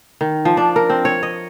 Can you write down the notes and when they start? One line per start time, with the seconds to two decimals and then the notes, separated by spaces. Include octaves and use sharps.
0.21 D#3
0.45 F3
0.57 D4
0.76 A#4
0.90 C4
1.05 C#5
1.23 D#5